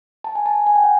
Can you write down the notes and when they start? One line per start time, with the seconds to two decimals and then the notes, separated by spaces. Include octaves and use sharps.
0.24 A5
0.35 G#5
0.46 A5
0.67 G#5
0.75 G5
0.84 F#5